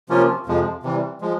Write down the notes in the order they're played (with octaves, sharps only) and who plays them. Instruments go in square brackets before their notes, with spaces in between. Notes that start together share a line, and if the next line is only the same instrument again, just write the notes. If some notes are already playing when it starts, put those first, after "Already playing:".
[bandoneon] C3 F3 A#3 C#4 F4
F2 C3 F3 G#3
C3 E3 G3
F3 G#3